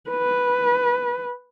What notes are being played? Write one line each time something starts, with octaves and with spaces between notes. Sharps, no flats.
B4